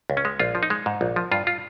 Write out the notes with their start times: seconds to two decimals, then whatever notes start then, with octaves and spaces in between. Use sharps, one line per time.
0.10 C#2
0.17 C#4
0.25 G#3
0.40 A#1 F4
0.55 F3
0.63 D#4
0.70 G#3
0.86 G#2
1.01 A#1
1.16 F3
1.31 G2 F4
1.47 F4